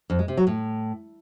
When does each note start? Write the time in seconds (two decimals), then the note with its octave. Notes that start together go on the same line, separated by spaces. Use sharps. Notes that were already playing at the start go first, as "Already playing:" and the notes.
0.10 F2
0.19 G#3
0.28 C3
0.37 F#3
0.47 A2